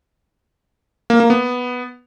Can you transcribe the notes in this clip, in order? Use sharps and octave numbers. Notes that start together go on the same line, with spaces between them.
A#3
A#3
B3